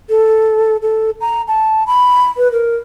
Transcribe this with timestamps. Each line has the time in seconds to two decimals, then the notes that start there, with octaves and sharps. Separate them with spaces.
0.10 A4
0.82 A4
1.21 A#5
1.48 A5
1.87 B5
2.37 B4
2.52 A#4